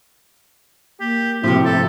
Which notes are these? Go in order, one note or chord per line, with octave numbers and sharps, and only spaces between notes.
A#3 G4
A2 C3 F3 C4 E4 F#4 G4
A4